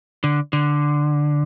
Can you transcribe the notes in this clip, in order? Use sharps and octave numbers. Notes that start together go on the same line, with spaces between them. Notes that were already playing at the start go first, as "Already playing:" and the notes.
D3
D3